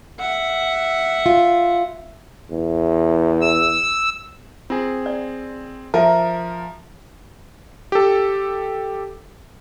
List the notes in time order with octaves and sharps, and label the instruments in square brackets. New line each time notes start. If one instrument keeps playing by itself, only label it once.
[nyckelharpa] E5 F#5
[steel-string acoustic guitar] F4
[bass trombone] E2
[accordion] E6
[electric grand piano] C4 G#4 [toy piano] F4
[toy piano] D5
[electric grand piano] F3 [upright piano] A#4 [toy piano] E5 A5
[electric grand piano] G4 A4